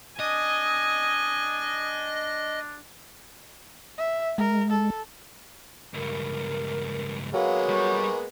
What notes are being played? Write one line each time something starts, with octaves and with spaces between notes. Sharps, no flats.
D4 D#5 G#5 D#6
E5
G#3 A#4
A4
C#2 G2 A#4
F#3 G#3 A#3 B3 F5
G3 C#6